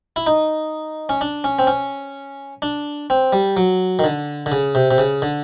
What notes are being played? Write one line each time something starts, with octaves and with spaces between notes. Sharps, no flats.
E4
D#4
C#4
D4
C#4
C4
C#4
D4
C4
G3
F#3
D#3
D3
D3
C#3
C3
C3
C#3
D3